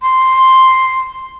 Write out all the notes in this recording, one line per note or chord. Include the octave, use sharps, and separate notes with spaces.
C6